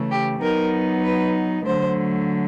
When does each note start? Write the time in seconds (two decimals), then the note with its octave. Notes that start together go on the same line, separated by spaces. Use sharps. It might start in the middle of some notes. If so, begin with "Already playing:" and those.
Already playing: C#3 E3 A3
0.11 G4
0.42 F#3 B3 D#4 A#4
1.04 B4
1.67 D3 F#3 A3 C5